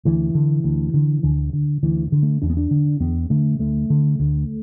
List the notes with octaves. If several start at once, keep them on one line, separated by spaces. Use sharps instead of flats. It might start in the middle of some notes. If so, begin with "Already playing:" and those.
D2 E3
D3
D2
D3
D2 D3
D3
D2 E3
D3
A3
E2 D4
B3
D4
D3
E2 B3
D3 A3
D2 A3
D3
D2